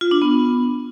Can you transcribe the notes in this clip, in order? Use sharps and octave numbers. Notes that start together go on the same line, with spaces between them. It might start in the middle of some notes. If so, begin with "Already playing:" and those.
F4
D4
B3